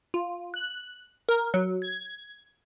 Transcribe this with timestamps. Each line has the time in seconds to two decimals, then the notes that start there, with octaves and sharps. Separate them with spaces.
0.14 F4
0.54 F#6
1.29 A#4
1.54 F#3
1.82 G#6